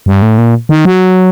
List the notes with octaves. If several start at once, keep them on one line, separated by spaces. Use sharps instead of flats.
G2
A2
A#2
D#3
F#3